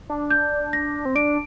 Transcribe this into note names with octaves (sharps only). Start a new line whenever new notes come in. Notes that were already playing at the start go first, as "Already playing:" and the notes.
D4
G6
A#6
C4
D4 D7